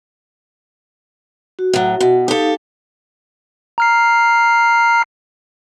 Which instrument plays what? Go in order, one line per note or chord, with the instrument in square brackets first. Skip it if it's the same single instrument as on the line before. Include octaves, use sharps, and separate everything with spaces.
[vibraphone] F#4
[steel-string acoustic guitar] A2 F#3
B2
[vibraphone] D#4 F5 [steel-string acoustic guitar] G4 A4
[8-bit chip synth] A#5 F6 C7